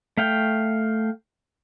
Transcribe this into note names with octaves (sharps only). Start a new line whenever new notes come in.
A3 F5 G5